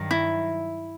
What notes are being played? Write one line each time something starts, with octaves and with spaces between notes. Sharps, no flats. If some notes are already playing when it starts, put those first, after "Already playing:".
Already playing: G2 D#3 F#3
E4